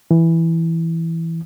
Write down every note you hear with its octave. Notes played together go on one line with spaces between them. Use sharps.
E3